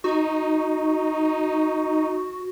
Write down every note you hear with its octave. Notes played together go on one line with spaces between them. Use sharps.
D#4 F#4